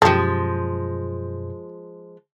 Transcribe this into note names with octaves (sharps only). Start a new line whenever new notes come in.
F#2 B2 F3 G#3 G4 A4 G6